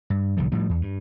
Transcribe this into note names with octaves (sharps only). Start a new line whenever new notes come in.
G2
D1 C2 D#3 F3
A2 F3 G3
E2
G2